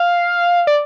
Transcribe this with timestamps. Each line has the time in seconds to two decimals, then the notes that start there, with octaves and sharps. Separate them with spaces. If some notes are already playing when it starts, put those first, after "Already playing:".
Already playing: F5
0.67 D5